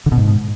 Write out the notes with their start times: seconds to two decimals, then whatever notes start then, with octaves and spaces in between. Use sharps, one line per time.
0.06 D3
0.12 B2
0.18 G#2